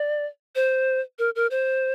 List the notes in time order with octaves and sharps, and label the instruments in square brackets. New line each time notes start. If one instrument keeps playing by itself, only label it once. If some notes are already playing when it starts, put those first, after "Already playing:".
Already playing: [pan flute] D5
C5
A#4
A#4
C5